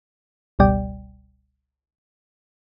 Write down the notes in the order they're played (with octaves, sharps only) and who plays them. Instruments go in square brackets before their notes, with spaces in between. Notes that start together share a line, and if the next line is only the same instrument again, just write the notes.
[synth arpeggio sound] G1 C#2 B2 G3 D5 G5